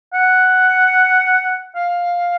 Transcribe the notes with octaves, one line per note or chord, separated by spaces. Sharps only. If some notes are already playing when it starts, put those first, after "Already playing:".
F#5
F5